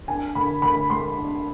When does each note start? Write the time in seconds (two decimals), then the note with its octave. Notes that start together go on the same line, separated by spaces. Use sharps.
0.07 D4 G#5
0.35 D3 B5
0.62 D3 B5
0.90 G#3 C6
1.17 D4